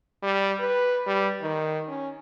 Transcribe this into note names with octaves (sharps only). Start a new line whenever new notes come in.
G3
B4
G3
D#3
C#4